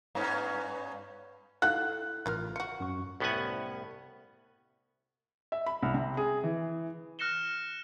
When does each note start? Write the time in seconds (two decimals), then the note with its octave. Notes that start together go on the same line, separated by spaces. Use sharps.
0.15 G2 B3 C#4
1.62 D#4 E4 A4 F5 F#5 F#6
2.26 A1 E3 F4 A#4 F6
2.56 F4 F#4 C#7
2.80 F#2 C#6
3.20 C2 A2 B3 C#4 F#5 G#5
5.52 E5
5.66 B5
5.83 C2
5.94 C3
6.17 G#4
6.43 E3
7.19 F6 F#6 A#6 C#7 E7 G7